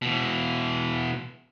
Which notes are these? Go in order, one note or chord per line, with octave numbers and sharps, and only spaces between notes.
B2 E3